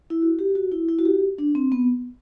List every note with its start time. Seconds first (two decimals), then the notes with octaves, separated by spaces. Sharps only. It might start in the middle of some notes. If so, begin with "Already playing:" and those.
0.10 E4
0.22 F#4
0.39 G4
0.55 F#4
0.72 E4
0.89 E4
0.99 F#4
1.05 G4
1.38 D4
1.55 C4
1.72 B3